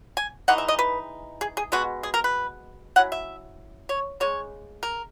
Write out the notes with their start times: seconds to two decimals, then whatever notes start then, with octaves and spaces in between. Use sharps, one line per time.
0.17 G#5
0.48 E3 G#3 D#4 F#5
0.58 E5
0.68 D#5
0.79 B4
1.41 G#4
1.57 G#4
1.72 B2 G#3 B3 F#4
2.03 G#4
2.14 A#4
2.24 B4
2.96 F#3 C#4 E4 F#5
3.12 E5
3.89 C#5
4.20 C#3 G#3 C#5
4.83 A#4